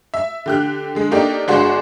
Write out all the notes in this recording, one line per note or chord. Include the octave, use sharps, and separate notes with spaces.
E5
D3 G4 F#6
D3 G#3
A3 A#3 D4 D#4 G4
G1 G#3 D4 F#4 G#4 C6